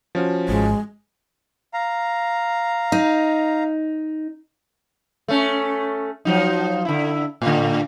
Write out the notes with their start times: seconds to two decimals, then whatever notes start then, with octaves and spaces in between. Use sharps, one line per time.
0.15 F3 C#4 F#4
0.49 G#1 G#2 G#3
1.74 F5 A#5
2.92 D#4
5.28 A3 C#4
6.25 F3 F#3 D#4
6.85 D3 E4
7.42 A2 D3